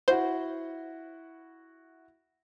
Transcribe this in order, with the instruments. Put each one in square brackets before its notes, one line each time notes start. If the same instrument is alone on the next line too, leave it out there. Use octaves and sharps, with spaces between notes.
[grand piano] E4 F#4 F#5 [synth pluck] C5